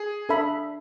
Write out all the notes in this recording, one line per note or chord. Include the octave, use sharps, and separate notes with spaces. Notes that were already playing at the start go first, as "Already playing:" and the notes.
Already playing: G#4
D4 A4 E5 B5